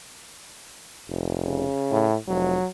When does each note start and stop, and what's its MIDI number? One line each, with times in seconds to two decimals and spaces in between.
1.09 1.64 29
1.46 2.07 49
1.91 2.16 45
2.28 2.57 29
2.28 2.67 54